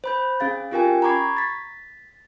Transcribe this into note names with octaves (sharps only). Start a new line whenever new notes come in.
C5 B5 G6
C#4 G#4 F5 A6
C#4 F4 G4 A#4 G5 G#5
A#5 B5 C#6 D6 G#6 C7
A6 B6